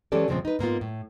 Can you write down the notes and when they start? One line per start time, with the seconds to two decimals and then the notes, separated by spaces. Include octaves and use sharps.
0.12 E3 G#3 C#4 G4 A4 D5
0.28 E2 A#2 C#3 F3 G#3 C4
0.45 D#4 B4
0.59 G#2 A#3 B3 F4
0.81 A2